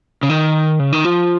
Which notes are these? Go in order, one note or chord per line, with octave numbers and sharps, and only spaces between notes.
C#3
D#3
C#3
D#3
F3